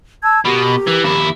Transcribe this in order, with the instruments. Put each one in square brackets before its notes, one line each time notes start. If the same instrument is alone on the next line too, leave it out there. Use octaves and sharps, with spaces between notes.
[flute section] A5 E6 G#6
[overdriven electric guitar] B2 [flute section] G4 A#4
[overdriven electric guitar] E3
D#2 E4